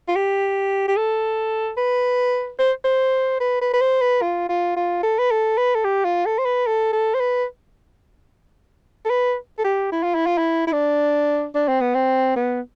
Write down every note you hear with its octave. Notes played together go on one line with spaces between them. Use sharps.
F4
G4
G4
A4
B4
C5
C5
B4
B4
B4
C5
B4
F4
F4
F4
A4
B4
A4
B4
A4
G4
F4
A4
C5
B4
A4
A4
C5
B4
A4
B4
A4
G4
E4
F4
E4
F4
E4
E4
D4
D4
C4
B3
C4
B3